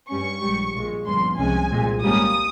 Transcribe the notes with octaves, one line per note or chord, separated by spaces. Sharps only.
G2 G3 C#4 C#6
A#1 G#2 G3
A#1 A#2 G#3
G1 G2 F3 A#3 C#4 C6
C2 C3 F3 G#3 C#4 G#5
C2 A#2 G#3 C4
G#1 G#2 G3 A#3 C#4 D#6